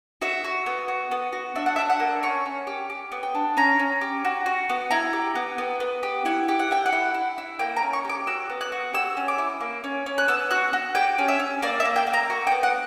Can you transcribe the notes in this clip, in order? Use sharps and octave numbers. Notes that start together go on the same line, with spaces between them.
F#4 E5
F#4
B3
F#4
B3
F#4
D4 E5
F#5
E5
D4
F#5
A#3
C#4 C#6
C#4
G4
G4
B3
G5
D4
C#4 A#5
C#4
G4
F#4
F#4
B3
E4 A#5
G4
B3
B3
B3
G4
E4 F#5
G4
F#5
E4 G5
F#5
E4
E4
E4
A#3 G5
A#5
C#4
C#6
G4 D6
F#4 E6
B3
F#6
F#4
G4 E6
C#4
D6
E4
A#3
C#4
C#4
F#6
B3 E6
F#4 F#6
F#4
G4 G5
C#4
E5
C#4
A#3 D5
E5
A#3
G5
A#3
A#5
F#4
G5
B3
F#5